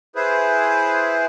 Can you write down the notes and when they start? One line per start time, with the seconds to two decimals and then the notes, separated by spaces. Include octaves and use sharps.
0.16 E4 G#4 B4 C5